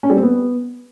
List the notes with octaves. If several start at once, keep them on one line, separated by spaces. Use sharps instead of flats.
C#4
G3
C4
B3